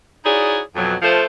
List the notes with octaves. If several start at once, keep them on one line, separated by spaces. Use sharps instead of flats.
D#4 E4 F#4 G#4 C#5 D5
F2 B2 F#3
F3 A3 C5